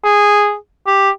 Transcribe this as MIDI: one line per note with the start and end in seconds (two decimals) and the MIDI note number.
0.04 0.55 68
0.87 1.10 67